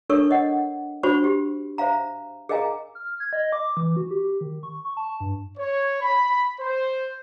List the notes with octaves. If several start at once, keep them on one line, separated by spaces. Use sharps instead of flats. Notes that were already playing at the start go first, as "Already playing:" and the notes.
D4 A4 A#4 C#5 C#6 E6
C#5 D#5 F#5
D4 F#4 C5 B5 C#6
G4
C5 E5 F5 A#5
G#4 A#4 D#5 F5 G#5 A#5
F6
G#6
D#5
D6
E3
F#4
G4
D#3
C#6
C#6
A5
G2
C#5
B5
C5